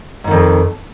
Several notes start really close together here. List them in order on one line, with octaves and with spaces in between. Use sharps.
G#2 D#3 F2